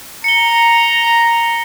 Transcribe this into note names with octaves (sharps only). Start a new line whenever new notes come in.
A#5 C#7 G7